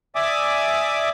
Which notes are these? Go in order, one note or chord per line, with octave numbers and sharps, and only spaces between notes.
D5 E5 G#5 D6 D#6